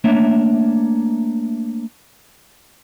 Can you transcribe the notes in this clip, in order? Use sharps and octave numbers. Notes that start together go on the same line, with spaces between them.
A3 A#3 D4 C#5 E5